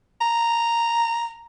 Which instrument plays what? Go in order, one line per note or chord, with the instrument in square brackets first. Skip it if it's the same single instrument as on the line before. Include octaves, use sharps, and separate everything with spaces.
[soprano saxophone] A#5